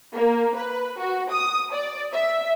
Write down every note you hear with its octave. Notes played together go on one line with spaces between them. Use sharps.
A#3
B4
F#4
D#6
D5
E5